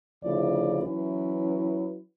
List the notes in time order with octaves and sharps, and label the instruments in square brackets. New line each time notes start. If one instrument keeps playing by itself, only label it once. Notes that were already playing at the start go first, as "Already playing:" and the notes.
[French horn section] D2 C#3 F3 E4 D5
E3 F#3 C#4 E4 B4